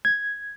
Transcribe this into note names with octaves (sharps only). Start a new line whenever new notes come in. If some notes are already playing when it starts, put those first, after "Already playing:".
G#6